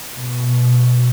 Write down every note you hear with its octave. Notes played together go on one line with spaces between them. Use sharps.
B2